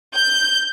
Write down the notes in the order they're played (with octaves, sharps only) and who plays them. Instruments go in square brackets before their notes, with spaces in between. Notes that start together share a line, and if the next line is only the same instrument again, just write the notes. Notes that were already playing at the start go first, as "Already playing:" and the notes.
[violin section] G6